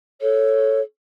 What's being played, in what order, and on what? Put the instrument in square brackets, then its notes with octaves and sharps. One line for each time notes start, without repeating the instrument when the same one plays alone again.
[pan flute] A4 [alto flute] C#5